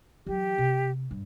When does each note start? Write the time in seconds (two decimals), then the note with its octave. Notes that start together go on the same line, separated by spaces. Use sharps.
0.27 E3 F#3 G4
0.58 C3
1.11 G2